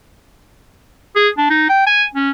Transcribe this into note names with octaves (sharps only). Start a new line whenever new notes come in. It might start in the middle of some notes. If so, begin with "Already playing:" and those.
G#4
D4
D#4
G5
G#5
C#4